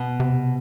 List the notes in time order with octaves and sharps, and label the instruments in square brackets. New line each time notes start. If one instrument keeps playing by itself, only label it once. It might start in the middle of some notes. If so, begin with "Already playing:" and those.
Already playing: [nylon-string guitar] B2
[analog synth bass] C3